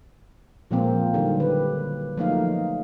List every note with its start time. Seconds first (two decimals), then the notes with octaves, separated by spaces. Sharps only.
0.71 A#2 F3 G#3 A#3 C4
1.14 D3 D#3 F#3 G3
1.40 G4 B4
2.17 F3 F#3 A3 A#3 D#4 F5